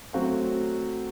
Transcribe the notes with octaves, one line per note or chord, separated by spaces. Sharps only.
F#3 A3 C4 F#4 C5